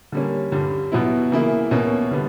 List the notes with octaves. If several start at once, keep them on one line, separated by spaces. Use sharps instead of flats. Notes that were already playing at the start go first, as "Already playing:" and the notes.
D3 G3 A#3 C#4
G2 D3 G3
B2 F#3 B3 E4
C#3 E3 A#3 E4
B2 A#3 C#4
D3 G3 B3